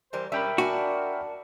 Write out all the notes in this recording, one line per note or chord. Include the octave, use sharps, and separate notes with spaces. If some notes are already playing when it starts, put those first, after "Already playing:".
E3 G3 A#4 C5
G3 C#4 D4 A#4 E5 G5 B5
D4 F#4 G#5